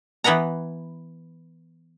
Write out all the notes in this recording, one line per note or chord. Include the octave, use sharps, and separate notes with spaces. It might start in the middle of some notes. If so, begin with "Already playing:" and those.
E3 B3 B4 F#5 A#5